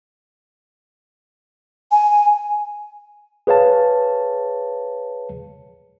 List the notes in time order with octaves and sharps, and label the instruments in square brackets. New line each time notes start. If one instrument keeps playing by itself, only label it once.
[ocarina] G#5
[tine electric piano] G#4 B4 C#5 F5 A5